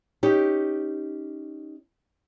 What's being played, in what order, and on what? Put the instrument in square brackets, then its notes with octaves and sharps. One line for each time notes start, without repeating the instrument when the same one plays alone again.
[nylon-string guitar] C#4 D#4 G4